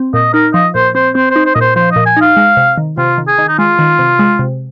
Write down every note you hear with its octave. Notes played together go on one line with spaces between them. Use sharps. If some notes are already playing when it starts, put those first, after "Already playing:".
Already playing: C4
A#2 D#5
D#4 A#4
F3 D#5
A#2 C5
C4 C5
C4 C5
D#4 C5
C5
A#2 D#5
C5
F3 C5
A#2 D#5
G#5
D#4 F5
G#3
C3
D#3
C3 F4
D#3
G#4
D#3
D#4
G#3 F4
D#3
C3
G#3
C3